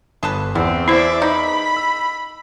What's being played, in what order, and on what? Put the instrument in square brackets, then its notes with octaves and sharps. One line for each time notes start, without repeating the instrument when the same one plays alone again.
[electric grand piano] G1 [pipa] G#4 A4 B4
[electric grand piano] E2 [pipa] B3 [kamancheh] C4
[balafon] E4 C5 [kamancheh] D5 E5
[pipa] D#4 [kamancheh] B5
[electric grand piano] E6